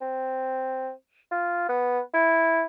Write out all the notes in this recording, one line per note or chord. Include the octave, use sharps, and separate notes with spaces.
C4
F4
B3
E4